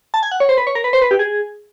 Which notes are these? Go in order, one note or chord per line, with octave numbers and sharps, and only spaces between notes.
A5
G#5
F#5
C#5
C5
B4
C#5
A#4
B4
C5
B4
G4
G#4